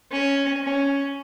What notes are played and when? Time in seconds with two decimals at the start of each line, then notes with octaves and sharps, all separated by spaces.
0.12 C#4
0.64 C#4